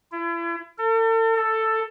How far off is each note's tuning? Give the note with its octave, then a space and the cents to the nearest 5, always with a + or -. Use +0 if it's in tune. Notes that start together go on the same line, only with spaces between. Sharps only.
E4 +40
A4 +40
A4 +10